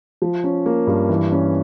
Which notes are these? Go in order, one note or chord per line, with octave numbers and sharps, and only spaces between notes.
F3
C#4
A#3
G2
E3
C#4